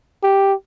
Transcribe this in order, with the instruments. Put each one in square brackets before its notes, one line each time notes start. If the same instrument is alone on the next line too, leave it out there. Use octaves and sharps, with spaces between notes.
[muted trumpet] G4